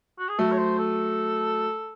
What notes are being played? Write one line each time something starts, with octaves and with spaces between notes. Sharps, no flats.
F#4
G#4
F#3 A3 A4
C#5
C5
A4